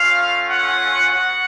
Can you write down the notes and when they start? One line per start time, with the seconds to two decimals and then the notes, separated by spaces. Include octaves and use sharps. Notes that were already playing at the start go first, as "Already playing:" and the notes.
Already playing: A3 C#4 F4 F5
0.49 F#5
1.12 B3 F#4 F#5